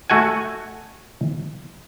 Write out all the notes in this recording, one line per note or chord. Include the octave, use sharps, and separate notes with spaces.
A3 F#4 F#5 G#5